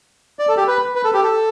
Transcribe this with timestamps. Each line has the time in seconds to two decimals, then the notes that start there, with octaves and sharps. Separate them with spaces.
0.39 D5
0.49 A4
0.57 G4
0.68 B4
0.95 B4
1.04 A4
1.14 G4
1.23 A4